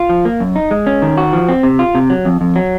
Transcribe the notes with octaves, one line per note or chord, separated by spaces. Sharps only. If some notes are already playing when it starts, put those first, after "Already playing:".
Already playing: F4
F3
A#3
F#2
D#4
G#3
C#4
D#3
F#4
F3
C4
C3
F4
C3
F#3
F2
F2
F#3